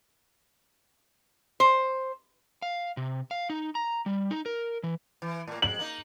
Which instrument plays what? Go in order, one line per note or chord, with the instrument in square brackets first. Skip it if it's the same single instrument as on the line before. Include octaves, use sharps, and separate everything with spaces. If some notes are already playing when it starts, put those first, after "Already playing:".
[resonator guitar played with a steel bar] C5
[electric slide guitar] F5
C3
F5
D#4
A#5
G3
D#4
A#4
E3
[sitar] E3
A2 A#3
[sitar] F2 G#3 [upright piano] F#7
[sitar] A#3 D#4